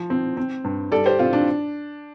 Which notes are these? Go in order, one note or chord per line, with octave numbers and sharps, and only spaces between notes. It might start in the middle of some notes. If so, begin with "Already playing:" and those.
Already playing: F3
C4
C4
G2
G3 A4 D5
G4 C5
C4 F4
D4